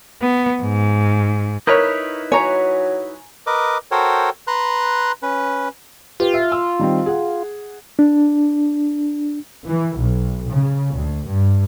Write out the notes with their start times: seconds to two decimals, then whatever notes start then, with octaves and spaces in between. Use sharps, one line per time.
0.22 B3
0.62 G#2
1.67 D#4 E4 A#4 B4 C#5
2.32 F#3 C#5 G#5 A#5
3.47 A#4 B4 D#5 D6
3.91 F#4 A4 A#4 C5 C#5 G5
4.47 B4 A#5 C6 F#6
5.22 C#4 B4
6.20 F4 G4 B4
6.34 E5
6.52 E6
6.79 D#3 G3 C4
7.06 G#4 F#5
7.99 D4
9.67 E3
10.00 B1
10.50 C#3
10.93 D2
11.31 G2